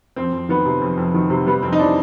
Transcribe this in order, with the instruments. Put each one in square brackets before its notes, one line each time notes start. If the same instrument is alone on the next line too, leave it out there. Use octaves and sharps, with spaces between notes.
[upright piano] F2 C4
F2
D#3 B3
C3
F2
F2
D#3
C3
G3 B3
F2 C4
D#4
E3 D4